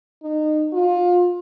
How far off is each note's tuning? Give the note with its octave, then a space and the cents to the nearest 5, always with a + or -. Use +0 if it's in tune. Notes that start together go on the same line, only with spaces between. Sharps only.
D#4 -25
F4 +25